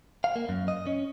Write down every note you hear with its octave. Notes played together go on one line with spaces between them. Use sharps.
F5
A#3
F#2
D#5
C#4